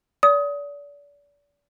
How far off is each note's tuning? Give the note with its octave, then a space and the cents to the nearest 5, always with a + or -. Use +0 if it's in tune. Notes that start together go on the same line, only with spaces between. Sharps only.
D5 -35 D#6 +20